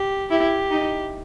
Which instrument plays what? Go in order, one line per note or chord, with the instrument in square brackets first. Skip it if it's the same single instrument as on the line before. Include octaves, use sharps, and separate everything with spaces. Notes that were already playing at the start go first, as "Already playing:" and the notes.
Already playing: [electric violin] G4
[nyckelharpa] E4 [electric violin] G4
[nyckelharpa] D#4